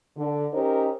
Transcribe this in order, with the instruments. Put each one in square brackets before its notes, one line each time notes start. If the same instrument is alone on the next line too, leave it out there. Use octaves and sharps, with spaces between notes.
[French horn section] D3
C#4 D#4 G4 A#4 C5